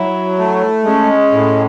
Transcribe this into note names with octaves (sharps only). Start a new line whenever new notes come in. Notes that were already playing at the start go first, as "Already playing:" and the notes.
Already playing: F#3 E4
A3
G#3 C#4
A2